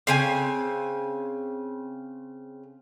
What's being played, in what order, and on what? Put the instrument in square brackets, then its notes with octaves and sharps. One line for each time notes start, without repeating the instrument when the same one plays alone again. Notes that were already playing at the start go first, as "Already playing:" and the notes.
[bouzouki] C#3 C4 G#5